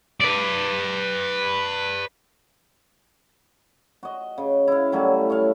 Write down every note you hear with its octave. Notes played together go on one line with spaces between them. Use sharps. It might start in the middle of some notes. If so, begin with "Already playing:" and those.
B4 D5
F#4 D#5
C#3
E4 F5
A2 F#3 G3
C#5 E5 F5